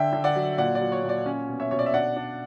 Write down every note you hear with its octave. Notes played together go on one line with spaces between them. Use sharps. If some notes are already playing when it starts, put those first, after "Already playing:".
Already playing: D3 E5 G5
D3
D5 F#5
F#3
A#2 D5 F#5
D5
F#3
C#5
A#2
D5
C#4
B2
C#5 E5
B2 C#5
D5
E5
D4 D5 F#5
D4